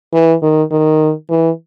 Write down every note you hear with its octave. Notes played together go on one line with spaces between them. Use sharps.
E3
D#3
D#3
E3